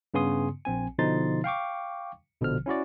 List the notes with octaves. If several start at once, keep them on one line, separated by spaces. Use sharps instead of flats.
G2 C#3 B3 G#5 C6 D#6
A#1 C4 G#5
B2 D3 F3 D#4 C6 A6
F5 G5 C#6 D6
A#1 B2 D3 F3 F6
C#4 E4 F#4 D5